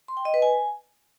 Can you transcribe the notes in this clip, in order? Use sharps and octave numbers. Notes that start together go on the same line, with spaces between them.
C6
G5
D#5
B4
G#5